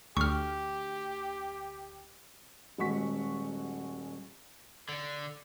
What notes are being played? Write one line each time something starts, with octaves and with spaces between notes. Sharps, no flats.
D2 G4 C#6 F6
D#1 G#3 F#4 C#6 B6
D3